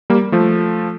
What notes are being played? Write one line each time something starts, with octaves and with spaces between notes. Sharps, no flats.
G3 A#3
F3 A3